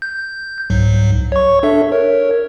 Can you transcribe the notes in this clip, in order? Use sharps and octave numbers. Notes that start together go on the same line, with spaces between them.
G6
C2 G#2 F#3
C#5 C#6
D4 A4 E5
A#4 C#5